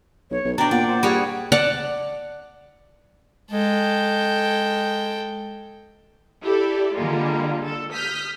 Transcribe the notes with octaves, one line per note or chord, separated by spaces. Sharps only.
B1 C#5
B1
B2 D4 D5 G5 A#5
A#2 D5 F#5
C5
G3 F#4 G#4 C#5
D5 F#5 A5
G#3 A4 G5
E4 G4 A4 D5
D3 G3 G#3 A#3 F4
A4
D#6 F6 G6 B6